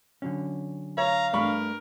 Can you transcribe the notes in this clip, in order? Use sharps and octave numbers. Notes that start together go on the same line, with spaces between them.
D3 F#3 C#4
C#5 F5 A#5
G2 A3 A#4 D5 B5 C#6